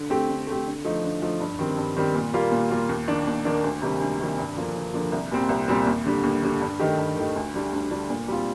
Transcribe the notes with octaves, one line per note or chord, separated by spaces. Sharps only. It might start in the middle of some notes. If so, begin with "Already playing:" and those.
Already playing: D3
A3 C4 G4
D3
A3 C4 G4
D3
F3 A3 D#4
D3
F3 A3 D#4
G2
D#3 G3 C4
G2
D#3 G3 C4
A#2
G3 A#3 F4
A#2
G3 A#3 F4
D#2
D#3 A#3 D4
D#2
D#3 A#3 D4
D2
C3 D#3 G3
D2
C3 D#3 G3
G2
D3 F3 A#3
G2
D3 F3 A#3
C2
A#2 G3 C4
C2
A#2 G3 C4
D#2
D3 G3
D#2
D3 G3
G2
D#3 A3 D#4 G4
G2
D#3 A3 D#4 G4
D2
D3 G3 D4
D2
D3 G3 D4
A#2
G3 C4 F4